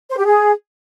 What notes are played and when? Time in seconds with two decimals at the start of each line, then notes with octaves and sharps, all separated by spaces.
0.09 C5
0.17 G4
0.26 G#4